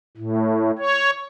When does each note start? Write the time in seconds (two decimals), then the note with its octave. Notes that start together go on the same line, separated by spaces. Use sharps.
0.17 A2
0.78 C#5